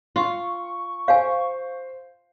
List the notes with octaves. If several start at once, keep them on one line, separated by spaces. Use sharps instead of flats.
F4 C#6
C5 F5 G#5